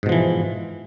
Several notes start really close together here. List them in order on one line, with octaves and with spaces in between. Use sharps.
G#2 B2 F3 E3